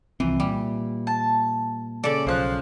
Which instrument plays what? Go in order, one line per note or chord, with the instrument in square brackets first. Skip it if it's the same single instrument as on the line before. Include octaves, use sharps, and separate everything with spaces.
[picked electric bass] C2 F3 C4 [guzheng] E3
[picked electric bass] A#2 [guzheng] G3
[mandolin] A5
[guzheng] C#3 A4 [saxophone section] D5
[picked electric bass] B1 [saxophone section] F3 [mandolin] C5 F#6